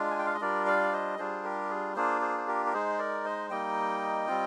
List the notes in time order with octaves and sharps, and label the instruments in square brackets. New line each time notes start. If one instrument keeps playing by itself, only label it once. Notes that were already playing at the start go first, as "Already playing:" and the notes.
Already playing: [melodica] G#3 D4 F4
G#5
G5
F5
D#5
G3 D4 F4 A#4 D5
D5 F5
C5 D#5
G3 D4 F4 G#4 C5
G4 A#4
G#4
A#3 D4 F4 G#4 C5
G#4 C5
C5
G4 A#4
A#4
G#3 D#4 G#4 C5
A#4 D5
C5 D#5
G3 A#3 D#4 D#5 G5
G3 C4 F4